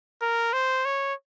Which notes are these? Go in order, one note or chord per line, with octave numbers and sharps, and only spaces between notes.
A#4
C5
C#5